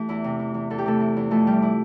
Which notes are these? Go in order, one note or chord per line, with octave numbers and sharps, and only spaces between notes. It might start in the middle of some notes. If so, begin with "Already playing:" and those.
Already playing: E3 A3 G4 A4
E2 E4
C3
E3
E2
E2 A4
G4
C3 A3 A4
E3
E2
F2 A3 A4
E3 G3 G4
E4